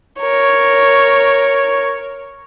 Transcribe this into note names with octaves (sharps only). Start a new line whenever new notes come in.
A#4 C#5